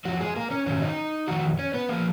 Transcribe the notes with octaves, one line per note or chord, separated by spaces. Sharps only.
F2 F3 F#3 F#4
G#3 G#4
A#3 A#4
C#4 C#5
G#2 D#3 F#3 C#4 C#5
D#4 D#5
F2 D#3 F#3 F#4 F#5
C#4 C#5
B3 B4
F3 A#3 A#4